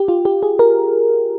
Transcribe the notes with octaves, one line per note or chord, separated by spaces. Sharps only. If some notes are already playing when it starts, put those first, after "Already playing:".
Already playing: G4
F4
G4
G#4
A#4